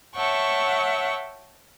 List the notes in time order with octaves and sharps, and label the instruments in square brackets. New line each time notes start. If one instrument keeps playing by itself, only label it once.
[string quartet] C#5 E5 F#5 G5 A5 C#6